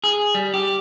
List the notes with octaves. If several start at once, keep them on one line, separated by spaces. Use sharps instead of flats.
G#4
G3
G4